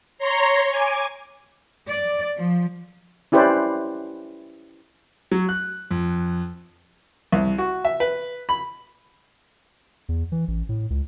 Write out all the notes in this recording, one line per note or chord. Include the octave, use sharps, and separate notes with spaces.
C#5 A#5 C6
G#5 D6
D5
F3
C#4 E4 G4 B4 C5 D5
F#3
F#6
F2
C2
F#4
E5
B4
B5
E2
E3
A1
A2
C#2